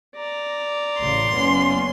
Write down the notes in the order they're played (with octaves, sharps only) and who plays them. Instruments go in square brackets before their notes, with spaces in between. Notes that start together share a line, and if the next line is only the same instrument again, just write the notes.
[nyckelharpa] D5 A#5
[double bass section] A1 C#3 [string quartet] C6
[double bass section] F#1 B3 C#4